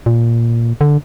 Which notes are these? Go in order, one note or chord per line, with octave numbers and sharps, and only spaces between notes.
A#2
D3